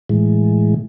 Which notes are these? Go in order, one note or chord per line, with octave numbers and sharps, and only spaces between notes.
A2 E3 G#3